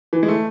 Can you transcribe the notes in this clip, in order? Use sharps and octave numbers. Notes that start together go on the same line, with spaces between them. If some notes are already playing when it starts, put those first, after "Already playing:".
E3
G#3
A3